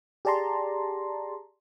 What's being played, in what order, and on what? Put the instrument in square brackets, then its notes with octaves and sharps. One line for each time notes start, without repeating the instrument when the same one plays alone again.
[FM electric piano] G4 G#4 D5 A5 A#5 C6